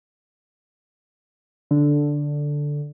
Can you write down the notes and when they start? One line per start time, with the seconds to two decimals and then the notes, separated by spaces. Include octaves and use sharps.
1.71 D3